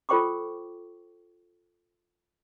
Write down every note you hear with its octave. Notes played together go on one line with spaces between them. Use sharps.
F4 A4 C5 G5 C#6 D6